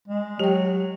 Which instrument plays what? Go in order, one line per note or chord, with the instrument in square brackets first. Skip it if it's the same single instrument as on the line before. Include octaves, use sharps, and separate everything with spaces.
[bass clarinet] G#3
[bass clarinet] F#3 [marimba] G4 G5